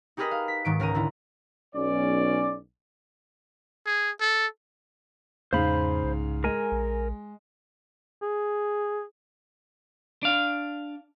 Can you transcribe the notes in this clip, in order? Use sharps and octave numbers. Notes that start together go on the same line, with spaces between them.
D#4 G4 G#4 A#4 B4 D#5
F5
B6
G#2 D#3 D7
C#2 A#4 A#5 D#7
D3 E4
B1 C#4 D5
G#4
A4
E2 G#2 C#3 C5 F5 B5
C2
G#3 A#4 G#5
A#1
G#4
D4 F5